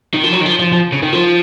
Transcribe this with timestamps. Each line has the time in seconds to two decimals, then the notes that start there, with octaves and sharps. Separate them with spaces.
0.14 D#3
0.23 F3
0.33 F#3
0.41 D#3
0.46 F3
0.59 F3
0.73 F3
0.92 C#3
1.02 D#3
1.13 F3